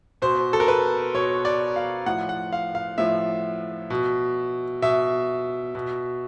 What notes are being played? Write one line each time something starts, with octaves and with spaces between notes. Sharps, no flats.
B2 C5
A4
A#4
B4
B2 C#5
D5
F5
A2 F3 F#5
F#5
F5
F5
A2 F3 E5
B2
B2 E5
B2